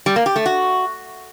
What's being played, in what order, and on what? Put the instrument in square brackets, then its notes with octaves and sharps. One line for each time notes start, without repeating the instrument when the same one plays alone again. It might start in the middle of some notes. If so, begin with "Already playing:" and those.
[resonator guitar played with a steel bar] G3
A#3
G4
A3
F#4